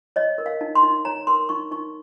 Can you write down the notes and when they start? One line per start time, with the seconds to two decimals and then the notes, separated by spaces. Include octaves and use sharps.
0.16 C#5 D#5
0.38 A#4
0.46 F5
0.61 D#4
0.75 C6
0.83 D#4
1.05 C#5 A#5
1.27 A#4 C6
1.49 D#4 C#6
1.71 D#4 C#6